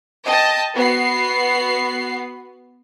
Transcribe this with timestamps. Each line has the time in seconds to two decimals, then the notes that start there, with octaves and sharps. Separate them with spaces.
0.24 D#5 G5 A5
0.74 B3 F#4 C7